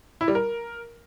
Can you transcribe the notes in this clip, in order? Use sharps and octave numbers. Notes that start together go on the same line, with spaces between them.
E4
G3
A#4